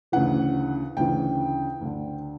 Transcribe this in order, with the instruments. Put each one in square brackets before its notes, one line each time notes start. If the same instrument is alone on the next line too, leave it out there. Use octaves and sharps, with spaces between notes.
[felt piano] D2 C#3 E3 F#5
D2 C#3 E3 G5
D2 D3